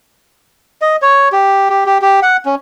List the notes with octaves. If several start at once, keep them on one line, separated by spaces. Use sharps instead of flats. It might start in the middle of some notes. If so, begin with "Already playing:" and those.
D#5
C#5
G4
G4
G4
G4
F#5
C#4